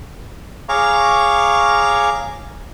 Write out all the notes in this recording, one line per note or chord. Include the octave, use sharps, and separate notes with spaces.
G#4 C#5 F5 A#5 C#6 D6